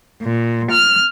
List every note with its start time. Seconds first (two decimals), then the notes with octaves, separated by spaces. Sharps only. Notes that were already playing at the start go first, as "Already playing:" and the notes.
0.23 A#2
0.72 F6